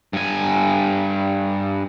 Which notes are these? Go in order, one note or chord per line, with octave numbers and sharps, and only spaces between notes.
G2 G#5